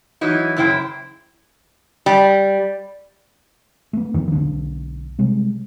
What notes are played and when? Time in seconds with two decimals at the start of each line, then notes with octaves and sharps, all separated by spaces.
0.21 E3 F#3 D#4 E4
0.56 F#2 C#3 E4 C5 G5
2.06 G3
3.93 A3 B3
4.14 D2 D#3 F3
4.32 B1 D3 A#3 D4
5.19 C3 G3 G#3